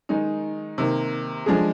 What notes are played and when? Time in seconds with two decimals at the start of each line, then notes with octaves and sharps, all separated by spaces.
0.09 D#3 G#3 D#4
0.78 C3 D#3 A#3
1.46 F3 G#3 D4 G#4